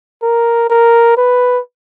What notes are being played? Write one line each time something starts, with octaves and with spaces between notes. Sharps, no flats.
A#4
A#4
B4